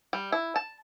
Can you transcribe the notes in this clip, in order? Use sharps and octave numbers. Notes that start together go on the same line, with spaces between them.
G3
E4
A5